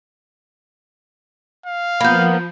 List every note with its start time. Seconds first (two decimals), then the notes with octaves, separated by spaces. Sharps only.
1.66 F5
2.00 F3 A#3 B3 B5 G6